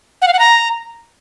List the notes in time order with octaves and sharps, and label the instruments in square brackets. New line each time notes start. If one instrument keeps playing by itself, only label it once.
[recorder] F#5
F5
F#5
A#5